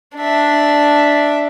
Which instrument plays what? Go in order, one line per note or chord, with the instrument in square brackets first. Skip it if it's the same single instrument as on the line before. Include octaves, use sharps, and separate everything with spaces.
[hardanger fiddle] D4 E5